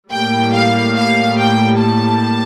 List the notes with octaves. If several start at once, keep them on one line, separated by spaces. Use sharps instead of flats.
A2 G3 A#3 G5
F5
F5
G5
A5